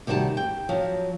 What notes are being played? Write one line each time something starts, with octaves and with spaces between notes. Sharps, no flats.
C3 D#3 G3 F#4 A5
G5
F3 F#3